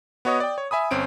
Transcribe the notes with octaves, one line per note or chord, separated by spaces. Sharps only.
B3 F#4 C#5 D#5 D#6
D5 G5
C#5
E5 G#5 B5 D#6
G1 C4 C#4 D7